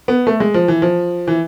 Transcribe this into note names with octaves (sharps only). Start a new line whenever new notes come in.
B3
A3
G#3
F3
E3
F3
E3